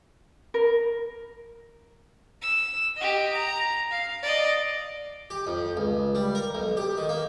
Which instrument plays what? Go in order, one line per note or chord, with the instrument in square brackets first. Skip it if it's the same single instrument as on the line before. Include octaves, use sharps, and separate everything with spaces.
[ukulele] A#4
[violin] E6
G4 D#5
A#5
F5
D5 D#5
[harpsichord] G4
F2
C#2
G3
A#4
B1
G4
D#3
A#3